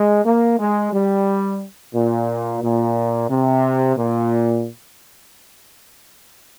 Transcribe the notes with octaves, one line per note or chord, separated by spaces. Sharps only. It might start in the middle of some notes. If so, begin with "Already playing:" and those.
Already playing: G#3
A#3
G#3
G3
A#2
A#2
C3
A#2